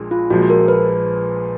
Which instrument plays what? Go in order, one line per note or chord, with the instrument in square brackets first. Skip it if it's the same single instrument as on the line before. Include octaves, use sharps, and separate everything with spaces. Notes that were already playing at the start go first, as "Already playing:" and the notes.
Already playing: [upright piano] A#1 A#2 G#3 D4
[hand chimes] F4
[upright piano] A#1 A#2 F3 G#3 [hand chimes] F#4
[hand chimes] A#4
B4